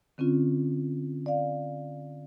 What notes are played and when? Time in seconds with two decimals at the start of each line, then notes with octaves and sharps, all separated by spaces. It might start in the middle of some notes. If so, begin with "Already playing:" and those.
0.18 D3 C4 C#4 F4
1.26 D5 F5